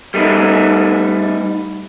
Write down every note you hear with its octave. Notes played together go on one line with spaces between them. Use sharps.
G3 A3 D#4 E4